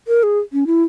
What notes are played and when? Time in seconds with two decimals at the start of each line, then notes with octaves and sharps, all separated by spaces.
0.08 A#4
0.23 G#4
0.53 C#4
0.67 E4